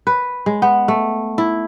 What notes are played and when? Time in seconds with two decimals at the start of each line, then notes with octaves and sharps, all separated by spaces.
0.07 B4
0.46 G#3
0.62 B3
0.88 A3
1.38 E4